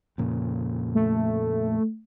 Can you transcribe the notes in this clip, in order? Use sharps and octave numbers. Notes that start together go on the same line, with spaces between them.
F2 A#2 C#3
A3